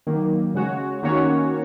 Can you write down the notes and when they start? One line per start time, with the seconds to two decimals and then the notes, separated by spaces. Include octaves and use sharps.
0.07 D#3 F#3 A#3
0.54 C#3 G#3 F#4 C#5
1.02 D#3 A#3 C#4 F#4 C#5